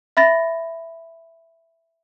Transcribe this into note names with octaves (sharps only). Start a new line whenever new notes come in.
E5 B5 A6 A#6